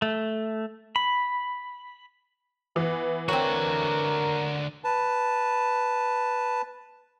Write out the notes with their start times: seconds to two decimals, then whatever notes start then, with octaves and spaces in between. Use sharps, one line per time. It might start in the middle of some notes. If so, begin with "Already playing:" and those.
0.02 A3
0.96 B5
2.76 E3 B3
3.28 D3 C4 F#4 A#4 C#5
4.84 B4 A5